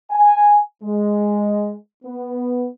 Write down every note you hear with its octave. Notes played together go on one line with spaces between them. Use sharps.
G#5
G#3
B3